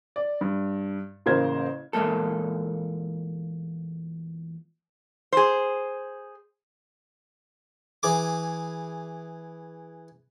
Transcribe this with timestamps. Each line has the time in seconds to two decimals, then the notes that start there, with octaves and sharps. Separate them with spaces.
0.16 D5
0.41 G2
1.26 A1 C#3 A#3 A#4 C5 G#6
1.93 E2 A#2 G#3 A#3 A4
5.32 G#4 C5
8.03 E3 G#4 D6